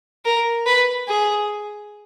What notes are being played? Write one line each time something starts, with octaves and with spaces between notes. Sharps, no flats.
A#4
B4
G#4